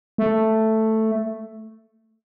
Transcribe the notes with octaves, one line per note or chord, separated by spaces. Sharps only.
A3